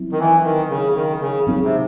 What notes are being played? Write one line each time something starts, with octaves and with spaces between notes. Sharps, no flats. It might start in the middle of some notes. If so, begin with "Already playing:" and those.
Already playing: F#3 C4 E4
D#3
E3
D#3
C#3
D#3
C#3
C#3 F#3 C4 D#4 G#4
C3